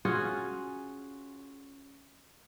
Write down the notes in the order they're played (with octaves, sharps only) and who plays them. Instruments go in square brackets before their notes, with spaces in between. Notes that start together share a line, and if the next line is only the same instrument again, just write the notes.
[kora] C#4 F4 F#4 G#4